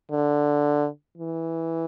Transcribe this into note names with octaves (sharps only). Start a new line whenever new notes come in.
D3
E3